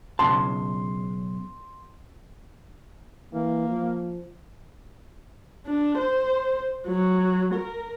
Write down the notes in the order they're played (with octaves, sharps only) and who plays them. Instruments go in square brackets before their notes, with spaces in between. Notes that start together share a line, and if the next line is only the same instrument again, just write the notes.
[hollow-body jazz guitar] B1 C#3 A5 [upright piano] C6
[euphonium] E3 [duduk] A#3
[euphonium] F3
[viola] D4
C5
F#3
A#4